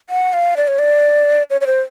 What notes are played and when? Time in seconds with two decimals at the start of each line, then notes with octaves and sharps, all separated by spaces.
0.10 F#5
0.33 F5
0.57 D5
0.68 C#5
0.79 D5
1.50 C#5
1.61 C#5
1.67 C5